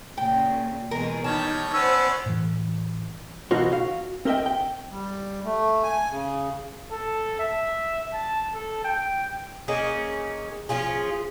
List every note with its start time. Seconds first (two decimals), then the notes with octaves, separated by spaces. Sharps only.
0.18 A#2 C#3 G5
0.91 B2 E3 G#3 A#4
1.24 D#3 G3 D#4 C#5 A5
1.74 B3 C#4 C5 D5 E6
2.26 A2 E3
3.51 B2 E3 A#3 D#4 F4 F#4
3.72 F#4 F5
4.25 C4 A#4 D#5 E5 G5
4.46 G5
4.91 G3
5.44 A3
5.83 G#5
6.10 C#3
6.91 A4
7.40 E5
8.13 A5
8.54 A4
8.84 G5
9.68 A#3 C#4 D#4 G#4
10.69 F3 C#4 F4 G#4